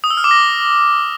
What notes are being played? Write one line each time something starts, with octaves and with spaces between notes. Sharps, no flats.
D#6
E6
F6
D6
A#6